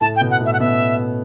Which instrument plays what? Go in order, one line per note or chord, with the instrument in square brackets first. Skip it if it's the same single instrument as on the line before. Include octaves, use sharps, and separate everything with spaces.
[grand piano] A2 A3 [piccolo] A5
[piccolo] G5
[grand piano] B2 B3
[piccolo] F#5
[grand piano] A2 A3 [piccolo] E5
[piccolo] F#5
[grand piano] B2 B3 [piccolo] E5